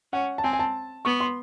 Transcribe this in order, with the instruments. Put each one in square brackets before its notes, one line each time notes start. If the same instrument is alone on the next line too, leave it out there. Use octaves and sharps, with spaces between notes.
[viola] C#4 [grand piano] F#5
[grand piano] A5
[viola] C4 [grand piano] G#5
[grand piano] G#5
A5
[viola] B3 [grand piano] C#6
[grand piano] C6